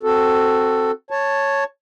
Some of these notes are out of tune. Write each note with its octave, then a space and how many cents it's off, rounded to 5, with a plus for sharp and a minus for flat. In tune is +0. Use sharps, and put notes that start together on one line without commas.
C4 +0 F#4 +0 A4 +5
C#5 +0 A5 +0